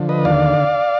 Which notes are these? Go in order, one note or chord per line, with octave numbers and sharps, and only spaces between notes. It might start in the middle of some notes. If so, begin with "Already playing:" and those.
Already playing: D3 F3
B4 D#5
D#2 D5 F5